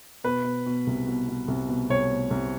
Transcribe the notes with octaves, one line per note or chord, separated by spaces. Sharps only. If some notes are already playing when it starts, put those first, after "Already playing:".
B2 B4
B2
B2
C2
B2
B2
C2
B2
C2 C#5
B2
C2